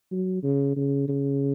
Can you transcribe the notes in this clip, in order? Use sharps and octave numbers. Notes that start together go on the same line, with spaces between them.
F#3
C#3
C#3
C#3